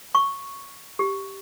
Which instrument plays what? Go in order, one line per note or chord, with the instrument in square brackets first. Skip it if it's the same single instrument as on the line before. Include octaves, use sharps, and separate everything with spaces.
[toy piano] C#6
G4